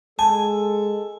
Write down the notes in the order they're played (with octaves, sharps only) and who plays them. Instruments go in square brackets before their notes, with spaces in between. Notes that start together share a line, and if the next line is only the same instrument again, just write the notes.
[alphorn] G#3 [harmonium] A4 [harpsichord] G#5 [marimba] A5